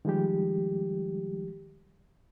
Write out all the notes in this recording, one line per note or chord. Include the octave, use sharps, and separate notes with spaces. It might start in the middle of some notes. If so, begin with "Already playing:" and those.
D#3 F3 G3 G#3 G4